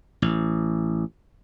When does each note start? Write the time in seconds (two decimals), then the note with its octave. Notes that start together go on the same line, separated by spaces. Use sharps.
0.22 A1